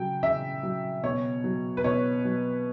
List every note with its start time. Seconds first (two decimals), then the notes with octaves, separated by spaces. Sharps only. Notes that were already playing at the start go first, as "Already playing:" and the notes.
Already playing: C#3 F#3 G5
0.23 C#3 E5
0.63 F#3
1.03 B2 C#5
1.44 F#3
1.77 B4
1.84 B2 C#5
2.25 F#3